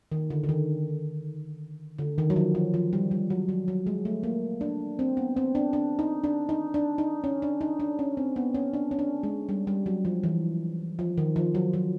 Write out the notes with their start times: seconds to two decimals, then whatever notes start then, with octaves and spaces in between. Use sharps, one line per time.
0.12 D#3
0.30 D3
0.44 D3
0.49 D#3
1.98 D3
2.18 D#3
2.30 F#3
2.36 F3
2.55 F3
2.74 F3
2.93 G3
3.11 G3
3.30 F#3
3.49 F#3
3.68 F#3
3.87 G#3
4.05 A3
4.23 A#3
4.61 D4
4.99 C4
5.17 B3
5.37 C4
5.55 D4
5.73 D4
5.99 D#4
6.24 D4
6.49 D#4
6.74 D4
6.98 D#4
7.24 C#4
7.42 D4
7.61 D#4
7.80 D4
7.99 C#4
8.17 C4
8.36 B3
8.54 C#4
8.73 D4
8.91 C#4
8.99 D4
9.23 G#3
9.49 G3
9.67 G3
9.86 F#3
10.05 F3
10.24 E3
10.99 F3
11.18 D#3
11.36 F3
11.55 F#3
11.73 F#3